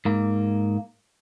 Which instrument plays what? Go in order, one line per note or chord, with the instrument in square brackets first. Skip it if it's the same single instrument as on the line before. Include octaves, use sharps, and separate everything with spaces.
[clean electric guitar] G#2 A#3